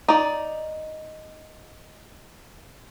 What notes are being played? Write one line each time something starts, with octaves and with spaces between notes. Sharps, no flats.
D#4 D5